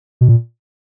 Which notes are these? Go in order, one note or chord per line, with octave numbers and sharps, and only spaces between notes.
B2
A#2